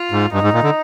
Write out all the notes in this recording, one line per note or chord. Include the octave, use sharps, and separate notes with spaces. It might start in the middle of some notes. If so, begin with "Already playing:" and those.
Already playing: F4
G#2
G2 D#4
G#2
A#2
D3